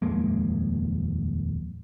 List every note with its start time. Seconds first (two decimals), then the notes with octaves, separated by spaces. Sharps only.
0.02 D#1 F2 G#3 A#3